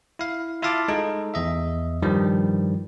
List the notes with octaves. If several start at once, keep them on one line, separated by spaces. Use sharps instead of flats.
E4 F5
E4 F4 E5 F5 A5 D6
G#3 D#4 A4
E2 D#5 E5
G2 D#3 F3 G3